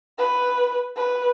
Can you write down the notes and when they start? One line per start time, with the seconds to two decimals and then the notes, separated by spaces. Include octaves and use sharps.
0.18 B4
0.96 B4